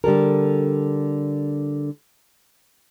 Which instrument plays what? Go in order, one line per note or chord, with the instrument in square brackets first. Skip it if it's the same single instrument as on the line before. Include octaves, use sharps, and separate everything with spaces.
[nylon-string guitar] D3 G3 A4 A#4